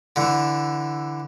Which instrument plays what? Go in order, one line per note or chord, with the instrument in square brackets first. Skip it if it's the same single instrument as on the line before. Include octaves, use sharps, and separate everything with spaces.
[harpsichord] D3 E3